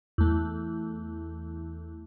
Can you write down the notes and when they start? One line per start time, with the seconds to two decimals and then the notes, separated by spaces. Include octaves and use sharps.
0.18 E2 A3